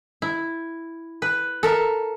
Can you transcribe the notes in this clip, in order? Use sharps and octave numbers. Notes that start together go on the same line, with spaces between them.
E4
B4
A4 A#4 E5